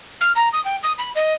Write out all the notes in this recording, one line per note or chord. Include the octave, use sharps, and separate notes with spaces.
F6
A#5
D#6
G5
D#6
B5
D#5